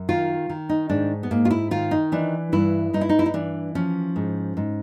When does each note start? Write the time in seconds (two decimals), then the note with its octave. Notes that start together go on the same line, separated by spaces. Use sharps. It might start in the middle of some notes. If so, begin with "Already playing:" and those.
Already playing: F#2
0.09 D#3 F4
0.50 D#3
0.69 D#4
0.90 G#2 D4
1.23 B3
1.31 G#2 A#3
1.45 F4
1.51 E4
1.71 D#3 F4
1.91 D#4
2.12 E3 D4
2.52 G2 E4
2.93 G2 D#4
3.01 E4
3.09 D#4
3.19 E4
3.26 D#4
3.34 E3 D4
3.75 F3 C#4
4.16 G#2
4.57 G#2